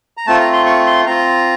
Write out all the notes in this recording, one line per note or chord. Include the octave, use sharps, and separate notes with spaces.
A#5
A3 C4 F4 A5
A#5
C6
C#6
C6
C4 F4 A#5